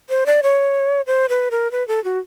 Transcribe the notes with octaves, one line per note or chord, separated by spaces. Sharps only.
C5
D5
C#5
C5
B4
A#4
B4
A4
F#4